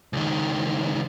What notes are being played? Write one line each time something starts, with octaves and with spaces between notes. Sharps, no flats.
C#2 D#3